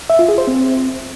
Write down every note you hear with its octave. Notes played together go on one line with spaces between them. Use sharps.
E5
F4
G#4
C5
C4